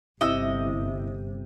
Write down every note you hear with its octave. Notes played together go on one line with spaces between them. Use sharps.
G1 C3 E4 D#5 E6